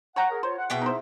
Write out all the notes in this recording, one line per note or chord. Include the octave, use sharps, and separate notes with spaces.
C#5 F#5 G5 A#5
G#4 A#4
F4 C5 C#5
F#5
B2 B3 E4 G#4 E5 G5
D#4 C5